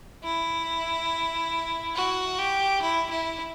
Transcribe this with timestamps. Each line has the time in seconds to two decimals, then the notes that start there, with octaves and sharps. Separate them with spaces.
0.24 E4
1.96 F#4
2.39 G4
2.82 E4
3.10 E4